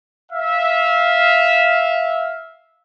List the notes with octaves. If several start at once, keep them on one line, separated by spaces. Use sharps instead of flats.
E5 F5